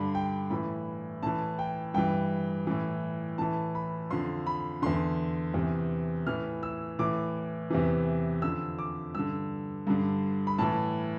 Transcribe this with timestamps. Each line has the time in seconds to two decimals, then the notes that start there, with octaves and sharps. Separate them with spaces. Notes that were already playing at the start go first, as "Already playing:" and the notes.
Already playing: G2 D3 B5
0.15 G5
0.50 A2 E3 B5
1.23 A2 E3 A5
1.59 G5
1.94 G2 E3 G5
2.67 A2 E3
3.38 A2 E3 A5
3.75 B5
4.10 F2 D3 C6
4.47 B5
4.82 E2 D3 C6
5.54 E2 C3 E3
6.27 A2 E3 F6
6.63 E6
6.99 A2 E3 D6
7.70 E2 C3 E3
8.42 F2 D3 E6
8.79 D6
9.15 G2 D3 E6
9.87 G2 D3
10.47 B5
10.58 A2 E3 A5